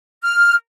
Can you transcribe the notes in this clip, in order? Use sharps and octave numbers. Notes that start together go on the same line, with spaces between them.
F6